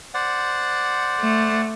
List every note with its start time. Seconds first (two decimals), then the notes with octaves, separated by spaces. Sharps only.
0.14 C5 D5 F#5
1.21 A3